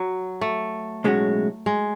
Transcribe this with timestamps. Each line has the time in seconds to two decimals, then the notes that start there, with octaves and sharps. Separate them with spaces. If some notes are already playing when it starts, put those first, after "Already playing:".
Already playing: F#3
0.41 A3
1.04 B1 A2 G#3 C#4 F#4
1.66 G#3